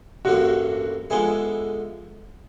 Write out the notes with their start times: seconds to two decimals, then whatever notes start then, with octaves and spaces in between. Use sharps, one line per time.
0.25 A1 G2 D3 F#3 A#3 F#4
1.10 D3 F3 G#3 B3 E4 G#4